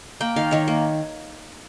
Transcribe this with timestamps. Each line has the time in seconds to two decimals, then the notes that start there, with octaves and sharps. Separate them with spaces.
0.21 A#3 G5
0.36 D#3 F5
0.51 D#3 C#5
0.68 A#3